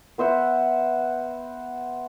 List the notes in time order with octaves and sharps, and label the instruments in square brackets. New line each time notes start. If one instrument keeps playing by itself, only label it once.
[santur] B3 C5 E5 F#5